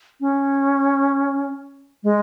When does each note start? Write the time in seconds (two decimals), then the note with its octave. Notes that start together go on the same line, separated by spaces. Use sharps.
0.21 C#4
2.03 G#3